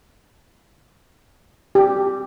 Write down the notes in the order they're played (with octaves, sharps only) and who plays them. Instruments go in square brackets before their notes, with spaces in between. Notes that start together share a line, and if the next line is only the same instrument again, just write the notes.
[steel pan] G4